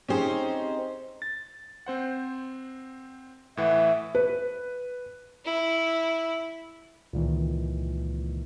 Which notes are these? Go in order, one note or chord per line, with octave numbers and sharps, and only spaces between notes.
C4 C#4 D#4 G4 G#4 C5
A6
C4 C5 F#5
A2 E3 E5 F#5
B4
E4
C#2 A#2 D#3 E3